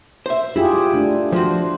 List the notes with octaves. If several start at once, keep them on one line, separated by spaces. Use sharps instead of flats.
C5 E5
E4 F4 G4 G#4
A3 D4
F3 F#4 C5